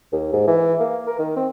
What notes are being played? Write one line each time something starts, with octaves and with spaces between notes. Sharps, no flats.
D#2
G#2
E3
A#3
A#4
D#3
C4